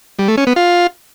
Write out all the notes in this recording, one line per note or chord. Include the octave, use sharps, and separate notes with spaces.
G3
A3
C#4
B3
F4